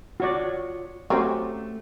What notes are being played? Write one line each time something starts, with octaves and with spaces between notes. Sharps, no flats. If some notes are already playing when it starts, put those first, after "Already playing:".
F4 F#4 C#5 D5
F#3 A3 C4 C#4 F#4 G4 C5